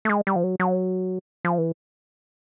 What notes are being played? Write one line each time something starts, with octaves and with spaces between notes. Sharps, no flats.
A3
G#3
G3
F3
F#3
F#3
F3
E3